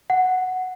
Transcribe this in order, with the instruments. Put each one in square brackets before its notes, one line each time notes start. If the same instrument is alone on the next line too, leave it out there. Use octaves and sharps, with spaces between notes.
[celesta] F#5